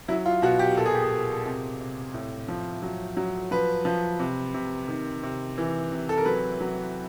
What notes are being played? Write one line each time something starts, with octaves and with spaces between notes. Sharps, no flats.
F#3 E4
F4
B2 F#4
G4
A#2 A4
G#4
G4
G#4
A#2
C3
C3
A2
F3
F#3
F#3
F3 B4
F3
C3
C3
D#3
C3
E3
C3
A4
A#4
F#3 B4
F#3